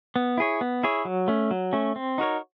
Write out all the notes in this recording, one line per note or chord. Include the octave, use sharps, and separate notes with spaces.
B3
E4 G#4 C#5
B3
E4 G#4 C#5
F#3
A3 C#4
F#3
A3 C#4
C4
D#4 F#4 A#4 C#5